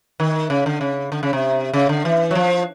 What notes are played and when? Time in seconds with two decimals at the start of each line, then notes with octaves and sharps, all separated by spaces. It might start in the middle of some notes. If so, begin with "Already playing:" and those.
0.20 D#3
0.50 C#3
0.66 D3
0.81 C#3
1.12 D3
1.23 C#3
1.33 C3
1.73 C#3
1.89 D3
2.05 E3
2.31 F#3
2.35 F3